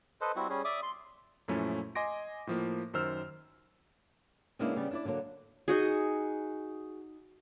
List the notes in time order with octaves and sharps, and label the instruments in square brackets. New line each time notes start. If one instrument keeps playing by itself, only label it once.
[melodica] A4 B4 C5 D#5
G3 C4 E4 F#4
G3 C#4 G#4
D5 E5 D6 D#6
C6
[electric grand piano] F#2 A#2 F3 A3 C#4 E4
D#5 G#5 C6 D6 A#6 D7
A2 F3 A#3
F#2 D#3 C5 E6 F6
[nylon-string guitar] C#3 G#3 A#3 B3 D4 E4
C#3 G3 B3 D5
D4 E4 D5
D3 F#3 A#3 C4 D4
[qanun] D#4 F#4 G#4